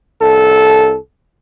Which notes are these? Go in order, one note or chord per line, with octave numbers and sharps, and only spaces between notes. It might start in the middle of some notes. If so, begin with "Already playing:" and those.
C2 A4